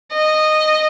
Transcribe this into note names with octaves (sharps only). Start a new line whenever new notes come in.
D#5